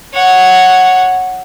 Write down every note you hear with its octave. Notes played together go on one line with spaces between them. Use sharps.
C#5 F#5